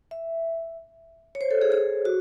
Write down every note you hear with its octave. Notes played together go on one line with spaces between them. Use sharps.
E5
C#5
C5
A4
G#4
G#4
F#4